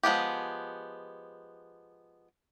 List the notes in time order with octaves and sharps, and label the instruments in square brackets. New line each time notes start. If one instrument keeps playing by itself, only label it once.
[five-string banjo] F3 G#3 B3 G4